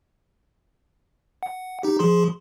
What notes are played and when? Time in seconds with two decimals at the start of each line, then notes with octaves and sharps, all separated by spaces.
1.43 F#5
1.83 D#4 G4
1.99 F3 G#4 C6